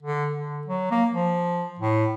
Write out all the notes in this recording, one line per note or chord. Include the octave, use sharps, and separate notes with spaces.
D3
D3
F#3
A#3
F3
A2